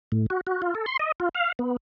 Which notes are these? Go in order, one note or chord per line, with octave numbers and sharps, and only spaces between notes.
A2
F#4
F#4
F4
A4
C6
D#5
F4
F5
B3